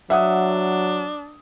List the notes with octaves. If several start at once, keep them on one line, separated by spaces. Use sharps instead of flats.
F#3 D4 E5 F#5 D#6